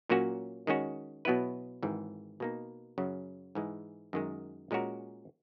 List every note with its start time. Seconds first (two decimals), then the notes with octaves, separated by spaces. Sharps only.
0.09 A#2 F#3 A#3 C#4 F#4
0.67 D#3 G#3 C#4 F#4
1.25 B2 F#3 B3 E4 B4
1.83 G#1 G#2 E3
2.40 B2 A#3 D#4
2.98 F#2 C#3 F#3
3.55 G#2 E3 G#3
4.13 F#2 D#3 G#3
4.71 A#2 G#3 C#4 F#4 A#4